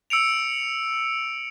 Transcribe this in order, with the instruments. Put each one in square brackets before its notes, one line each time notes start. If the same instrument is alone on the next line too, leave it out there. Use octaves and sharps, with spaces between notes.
[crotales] E6 C#7 D7 F7